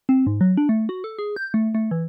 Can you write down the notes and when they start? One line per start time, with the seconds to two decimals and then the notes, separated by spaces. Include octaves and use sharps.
0.09 C4
0.27 G#2
0.41 F#3
0.57 D4
0.69 A3
0.89 F#4
1.04 A4
1.19 G#4
1.36 G6
1.54 A3
1.75 A3
1.91 E3